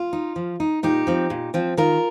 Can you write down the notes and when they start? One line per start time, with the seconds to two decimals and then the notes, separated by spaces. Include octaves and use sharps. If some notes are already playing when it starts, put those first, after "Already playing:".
Already playing: F4
0.13 D#4
0.36 F3
0.60 D#4
0.83 A#2 D#4 G4
1.07 F3 C4
1.30 A#2
1.54 F3 C4
1.77 D#3 F4 A#4